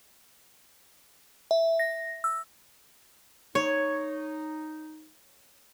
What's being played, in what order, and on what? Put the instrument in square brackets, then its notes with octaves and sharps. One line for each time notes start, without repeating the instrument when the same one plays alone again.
[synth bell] E5
A#6
E6
[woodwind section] D#4 [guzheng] C#5